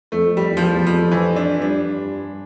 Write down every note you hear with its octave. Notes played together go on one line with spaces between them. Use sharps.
F2 A3
G3
E2
F3
G3
F2 F3
E3
D4
G2 D4